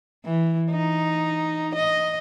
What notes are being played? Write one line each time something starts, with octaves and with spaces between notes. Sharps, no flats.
E3
D#4
D#5